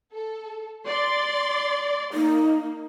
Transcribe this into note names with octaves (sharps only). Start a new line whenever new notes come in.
A4
D5 C6 A6
A#3 D#4